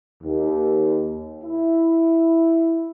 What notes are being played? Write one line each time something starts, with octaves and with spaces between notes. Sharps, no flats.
D#2
E4